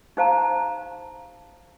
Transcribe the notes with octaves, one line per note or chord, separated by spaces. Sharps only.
D#4 G4 C5 F5 A5 A#5